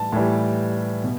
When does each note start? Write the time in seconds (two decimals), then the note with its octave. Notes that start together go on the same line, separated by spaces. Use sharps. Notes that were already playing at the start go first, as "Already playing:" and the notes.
Already playing: A2 E3 G3 A5
0.13 A2 E3 G3
1.04 B2